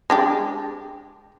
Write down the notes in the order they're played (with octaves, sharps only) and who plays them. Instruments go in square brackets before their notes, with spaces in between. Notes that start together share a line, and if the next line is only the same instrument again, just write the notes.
[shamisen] G#3 D4 G4